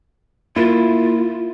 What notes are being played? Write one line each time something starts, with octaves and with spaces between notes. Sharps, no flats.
A#3 E4 F4